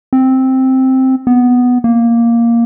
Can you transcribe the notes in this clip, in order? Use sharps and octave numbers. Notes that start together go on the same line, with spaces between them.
C4
B3
A#3